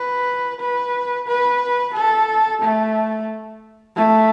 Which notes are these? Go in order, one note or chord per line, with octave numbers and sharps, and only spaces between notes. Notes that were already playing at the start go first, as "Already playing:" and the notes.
Already playing: B4
B4
B4
A4
A3
A3